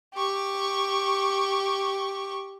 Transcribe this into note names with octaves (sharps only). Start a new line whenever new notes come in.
G4 C#6